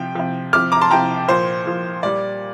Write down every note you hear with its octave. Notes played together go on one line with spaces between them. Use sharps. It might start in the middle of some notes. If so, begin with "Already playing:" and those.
Already playing: C3 F3 G5
C3 F3
C3 F3 D6 F6
A#5 D6
A5 C6
C3 F3 G5 A#5
A#2 F3 C5
A#2 F3
A#2 G3 D5